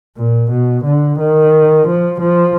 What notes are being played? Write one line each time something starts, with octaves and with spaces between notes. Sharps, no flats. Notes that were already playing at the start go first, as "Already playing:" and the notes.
A#2
B2
D3
D#3
F3
F3